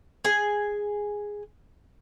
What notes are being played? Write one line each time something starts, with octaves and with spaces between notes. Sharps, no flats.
G#4 G#5